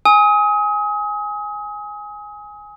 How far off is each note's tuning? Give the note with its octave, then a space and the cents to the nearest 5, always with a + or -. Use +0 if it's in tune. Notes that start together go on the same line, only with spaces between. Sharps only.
G#5 +0 D#6 +35